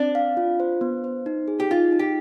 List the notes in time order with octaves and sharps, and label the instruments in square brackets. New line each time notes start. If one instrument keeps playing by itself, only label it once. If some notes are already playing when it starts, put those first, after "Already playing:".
Already playing: [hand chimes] C4 [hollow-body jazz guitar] D4
[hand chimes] F5
F4
C5
B3
C5
D#4
G#4
[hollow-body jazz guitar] G4
[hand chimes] D#4 [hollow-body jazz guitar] F4
[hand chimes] D#4
[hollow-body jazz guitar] G4